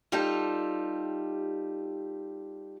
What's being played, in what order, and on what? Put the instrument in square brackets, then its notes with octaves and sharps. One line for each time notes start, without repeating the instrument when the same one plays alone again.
[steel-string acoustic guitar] G3 D#4 F4 G4 A4